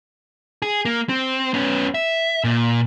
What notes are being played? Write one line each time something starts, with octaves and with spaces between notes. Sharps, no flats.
G#4
A#3
C4
B3 C#4
E5
A#2